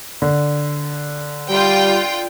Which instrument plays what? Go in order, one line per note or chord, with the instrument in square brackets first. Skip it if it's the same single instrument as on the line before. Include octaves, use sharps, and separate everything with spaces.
[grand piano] D3
[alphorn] G3 [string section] F4 G5